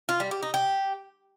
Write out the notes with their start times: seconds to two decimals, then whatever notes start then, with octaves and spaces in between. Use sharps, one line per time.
0.09 F4
0.20 G3
0.31 G4
0.43 D#4
0.54 G4